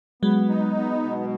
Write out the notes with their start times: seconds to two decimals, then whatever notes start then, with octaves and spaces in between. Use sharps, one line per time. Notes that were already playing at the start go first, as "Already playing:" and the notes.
0.22 F#3 G#3 B3
0.49 D#4
0.77 B3
1.03 B2